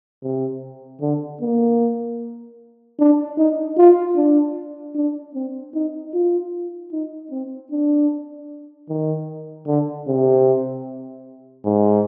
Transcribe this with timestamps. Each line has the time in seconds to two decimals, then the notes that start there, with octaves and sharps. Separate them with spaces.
0.23 C3
1.02 D3
1.42 A#3
2.99 D4
3.38 D#4
3.78 F4
4.16 D4
4.96 D4
5.35 C4
5.74 D#4
6.14 F4
6.93 D#4
7.31 C4
7.72 D4
8.89 D#3
9.67 D3
10.08 C3
11.65 G#2